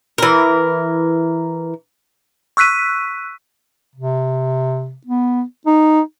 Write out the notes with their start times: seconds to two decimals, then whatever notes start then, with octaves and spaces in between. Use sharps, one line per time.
0.18 E3 A#4
2.57 C#6 E6 F#6 B6 D#7
3.95 C3
5.06 B3
5.66 D#4